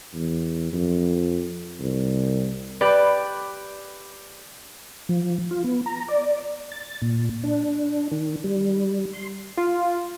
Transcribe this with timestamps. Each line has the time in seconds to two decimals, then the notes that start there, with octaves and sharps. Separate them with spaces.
0.14 E2
0.73 F2
1.80 C2
2.81 G4 B4 D5
5.09 F3
5.51 F4
5.64 B3
5.86 A#5
6.08 D5
6.72 A6
7.02 A#2
7.44 D4
8.12 D#3
8.44 G3
9.13 C6
9.57 F4